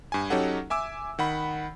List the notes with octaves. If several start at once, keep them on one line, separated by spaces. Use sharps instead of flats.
G2 G#5
F#3 C#4 D#4 G4 A4 F#5
E5 G#5 D6 E6
D#3 F#5 B5